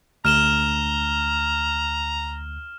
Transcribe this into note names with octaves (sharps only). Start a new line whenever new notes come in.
D2 A#5 F6 E7 G7